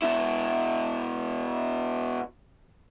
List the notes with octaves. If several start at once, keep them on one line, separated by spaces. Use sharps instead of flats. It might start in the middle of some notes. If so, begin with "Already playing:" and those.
B2 E4